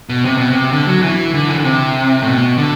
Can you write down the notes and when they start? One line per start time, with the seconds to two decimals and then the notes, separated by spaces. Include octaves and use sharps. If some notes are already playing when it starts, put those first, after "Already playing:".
0.09 B2
0.25 C3
0.37 B2
0.50 C3
0.72 D3
0.87 F#3
1.02 E3
1.34 D3
1.49 E3
1.56 D3
1.64 C3
2.22 A2
2.27 B2
2.58 D3